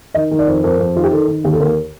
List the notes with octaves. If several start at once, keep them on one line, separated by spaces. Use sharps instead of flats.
D#3 D#5
D#3
D5
F2
F2 A#4
F2
D#3 F4
G4
D#3 A4
D#3
D#2 G4
A4
D#2 A#4